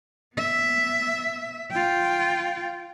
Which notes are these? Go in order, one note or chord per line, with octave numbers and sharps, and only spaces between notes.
B3 E5
F4 G5